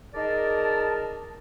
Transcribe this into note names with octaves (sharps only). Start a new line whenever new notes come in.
D#4 G#4 A#4 D5 A5